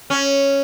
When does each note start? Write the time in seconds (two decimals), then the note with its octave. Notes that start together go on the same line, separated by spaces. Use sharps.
0.10 C#4